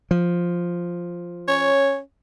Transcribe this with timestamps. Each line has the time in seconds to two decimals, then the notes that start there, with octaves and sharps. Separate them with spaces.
0.11 F3
1.48 C#4 C#5